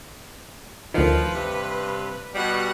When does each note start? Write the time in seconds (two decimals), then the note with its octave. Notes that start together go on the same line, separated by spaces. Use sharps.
0.94 D2 D#3 F3 B4
1.34 G2 C3
2.33 B2 G3 F#4 F#5